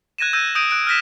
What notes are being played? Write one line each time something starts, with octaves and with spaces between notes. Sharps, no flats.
F#6 G#6 A#6 D#7 E7
E6 G6 G#6 A#6 D#7
D#6 G6 D7 D#7
F#6 D7
F6 F#6 A#6 B6 E7